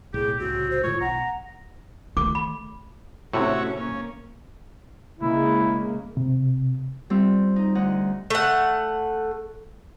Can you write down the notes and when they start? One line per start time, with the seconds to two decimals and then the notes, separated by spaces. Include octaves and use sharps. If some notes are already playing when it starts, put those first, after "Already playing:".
0.14 B1 A2 G#3 G4 G#4
0.40 C2 A2 C#3 C4 F#4
0.71 C5
0.83 A2 D#3 G#3 F4 C#5
1.00 B1 F#5 A#5
2.17 D#3 A3 D6
2.35 B5
3.33 A2 C3 A3 C#4 F#4 C#5 E5
3.77 A#3 C#4
5.18 C#3 G#3 A#3 E4
6.17 C3
7.10 G3 C4 F4 E6
7.56 D#4 D#5
7.75 D2 D#4 D#5 F#5 F#6
8.30 A3 F#5